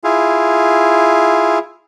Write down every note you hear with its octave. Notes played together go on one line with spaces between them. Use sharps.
E4 F4 G#4